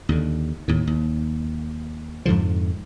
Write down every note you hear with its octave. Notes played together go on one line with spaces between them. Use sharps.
D#2 D3
D#2 A2
D#2
F2 G#2 D3 F3